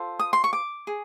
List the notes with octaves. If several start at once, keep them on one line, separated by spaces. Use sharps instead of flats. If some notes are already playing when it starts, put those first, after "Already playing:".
Already playing: F4 A4 C5
D#6
C6
C#6
D6
G#4